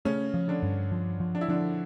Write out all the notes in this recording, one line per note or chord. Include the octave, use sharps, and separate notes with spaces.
C#3 A3 C#4
F3
D3 D4
G2
F3
F3
D4
E4
D3 F3 D4